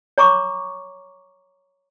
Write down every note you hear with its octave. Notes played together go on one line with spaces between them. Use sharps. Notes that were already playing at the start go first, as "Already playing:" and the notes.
C#5 A#5 C#6 D6